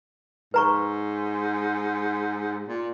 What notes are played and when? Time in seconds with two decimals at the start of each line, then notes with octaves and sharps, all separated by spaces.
0.54 G#2 B4 A#5 C#6
2.68 A#2